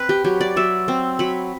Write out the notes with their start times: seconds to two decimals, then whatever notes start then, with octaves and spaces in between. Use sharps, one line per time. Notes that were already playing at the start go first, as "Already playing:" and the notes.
Already playing: C4 B4
0.09 G4
0.24 F#3 G4
0.41 D5
0.56 F#3 E5
0.88 C4
1.19 F#3 B5